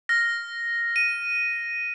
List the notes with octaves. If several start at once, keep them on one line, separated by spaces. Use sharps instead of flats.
F6 A#6
D#7